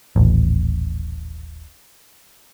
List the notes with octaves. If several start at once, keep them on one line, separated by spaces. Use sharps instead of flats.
D#1 A1